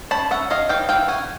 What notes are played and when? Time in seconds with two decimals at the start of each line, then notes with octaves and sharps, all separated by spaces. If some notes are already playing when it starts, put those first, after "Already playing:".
0.11 C#4 A5 B5
0.31 C#4 E5 F#5
0.50 C#4 D#5 F5
0.69 E3 F5 G5
0.89 E3 F5 G5
1.08 C#4 F#5 G#5